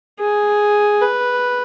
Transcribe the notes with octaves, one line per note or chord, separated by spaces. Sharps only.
G#4
B4